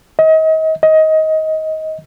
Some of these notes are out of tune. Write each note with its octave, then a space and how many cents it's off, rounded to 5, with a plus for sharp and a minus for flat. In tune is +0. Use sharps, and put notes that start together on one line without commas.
D#5 +35
D#5 +20